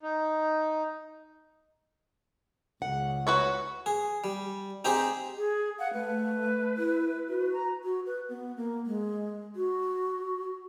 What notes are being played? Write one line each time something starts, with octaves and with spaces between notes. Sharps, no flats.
D#4
C#2 C#3 F#5
F#4 B4 C#5 C#6
G#4
G3
C4 D#4 G4 G#4 G#5
G#4
F5 F#5
A3 B4
E4
F#4
A#5
F#4
B4
B3
A#3
G#3
F#4